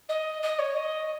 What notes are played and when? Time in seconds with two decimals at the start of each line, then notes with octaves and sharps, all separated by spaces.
0.08 D#5
0.42 D#5
0.58 C#5
0.75 D#5